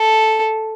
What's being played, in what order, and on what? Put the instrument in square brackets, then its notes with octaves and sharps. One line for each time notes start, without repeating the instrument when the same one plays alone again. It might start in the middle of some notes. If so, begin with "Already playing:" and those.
Already playing: [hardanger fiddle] A4